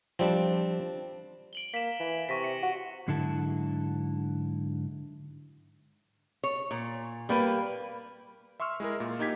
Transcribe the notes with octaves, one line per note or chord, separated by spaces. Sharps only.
F3 G3 C4 D4
D7 F#7 G7
A#3 B6 E7
E3
C3 C#6 A#6 B6
C#7
F#4
G#2 D3 F#3 E4 A4
C#5
A#2
G3 A#3 B4
E5 C6 C#6 E6 F6
G#3 E4 G#4 A#4
A#2
A#3 D#4 G4 G#6 B6